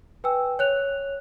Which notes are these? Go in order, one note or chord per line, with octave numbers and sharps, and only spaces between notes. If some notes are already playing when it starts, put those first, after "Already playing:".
B4 G5 G#5 E6
C#5 F#6 F7